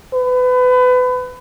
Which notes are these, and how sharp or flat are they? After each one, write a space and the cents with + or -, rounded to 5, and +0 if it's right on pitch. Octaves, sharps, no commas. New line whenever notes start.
B4 +30